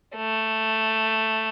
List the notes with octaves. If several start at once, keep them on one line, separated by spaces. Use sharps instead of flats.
A3